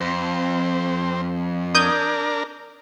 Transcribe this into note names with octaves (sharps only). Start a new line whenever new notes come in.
F2 C4
D4 A#4 D#6 G6 G#6